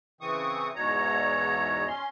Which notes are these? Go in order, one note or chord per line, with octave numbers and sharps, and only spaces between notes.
C#3 E3 C4 C#6 D#6
E2 G#2 B2 C#5 A#5
C#4 C6